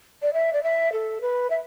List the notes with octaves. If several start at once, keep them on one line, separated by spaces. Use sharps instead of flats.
D5
E5
D5
E5
A4
B4
E5